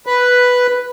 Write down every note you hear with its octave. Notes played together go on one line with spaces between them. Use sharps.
B4